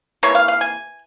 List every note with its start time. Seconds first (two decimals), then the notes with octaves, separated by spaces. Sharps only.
0.23 C3 E3 A#3 C#5
0.35 F5
0.48 F5
0.61 G#5